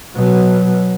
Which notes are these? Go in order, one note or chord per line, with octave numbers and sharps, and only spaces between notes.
B2 F#3